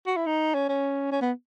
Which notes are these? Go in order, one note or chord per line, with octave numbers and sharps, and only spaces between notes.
F#4
E4
D#4
C#4
C#4
C#4
B3